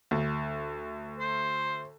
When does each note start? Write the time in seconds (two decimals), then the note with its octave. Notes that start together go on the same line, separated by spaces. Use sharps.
0.11 D2
1.20 C5